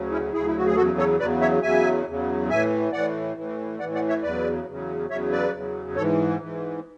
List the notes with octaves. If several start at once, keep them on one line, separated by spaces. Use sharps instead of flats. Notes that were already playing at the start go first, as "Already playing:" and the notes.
Already playing: D2 C#3 F#3
C#4 E4
D2 C#3 F#3 E4 G#4
E4
F#4
G#4
E2 C#3 F#3 F#4 A4
A4 C#5
E2 C#3 F#3 B4 D5
C#5 E5
E2 C#3 F#3 E5 G#5
E2 C#3 F#3
A2 E3 E5 G#5
A2 E3 D5 F#5
A2 E3
A2 E3 D5 F#5
D5 F#5
C#5 E5
E2 C#3 F#3 B4 D5
E2 C#3 F#3
E2 C#3 F#3 C#5 E5
B4 D5
E2 C#3 F#3
G#2 E3 A4 C#5
G#2 E3